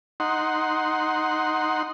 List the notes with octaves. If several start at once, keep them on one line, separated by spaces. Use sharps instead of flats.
D#4 F#5 C6